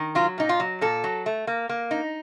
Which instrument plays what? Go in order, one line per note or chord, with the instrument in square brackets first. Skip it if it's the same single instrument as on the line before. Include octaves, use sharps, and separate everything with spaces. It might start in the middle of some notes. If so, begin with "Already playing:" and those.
Already playing: [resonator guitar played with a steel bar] D#3
F#3 F4
A#2 D#4
F4
F#3
A#2 A4
F#3
A3
A#3
A#3
D#4